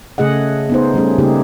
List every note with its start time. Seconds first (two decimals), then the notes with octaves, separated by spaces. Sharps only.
0.18 C#3 A3 G#4 D#5 F#5
0.70 B3 D#4 C5
0.94 G3 A3 C#4 G#4
1.18 C#3 A3 A#3 D#4 G4 G#4